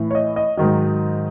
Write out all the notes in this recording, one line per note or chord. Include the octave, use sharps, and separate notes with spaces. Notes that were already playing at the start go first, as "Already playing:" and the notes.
Already playing: A2 E3
C#5
D#5
D#5
G#2 D#3 F#3 D#5